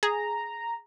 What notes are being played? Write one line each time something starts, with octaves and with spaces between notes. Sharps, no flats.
G#4 A#5